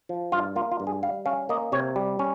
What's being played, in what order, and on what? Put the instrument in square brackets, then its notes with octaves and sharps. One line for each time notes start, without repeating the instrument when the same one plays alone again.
[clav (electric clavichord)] F3
G2 F4
A#3 F4
F4
G2
G#4
G3 F5
C#4 F5
A#3 D#5
C3 C#5
G3
C#4